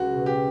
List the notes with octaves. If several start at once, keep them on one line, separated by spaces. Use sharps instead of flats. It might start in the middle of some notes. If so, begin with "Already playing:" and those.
Already playing: C#2 F#4
B2
G4